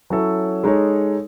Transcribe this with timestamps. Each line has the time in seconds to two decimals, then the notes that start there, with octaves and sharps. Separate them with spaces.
0.10 F#3 C#4 E4 A4
0.64 G#3 D#4 A4 C#5